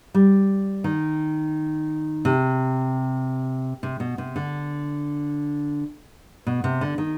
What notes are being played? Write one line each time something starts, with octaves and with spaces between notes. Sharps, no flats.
G3
D#3
C3
C3
B2
C3
D3
B2
C3
D3
D#3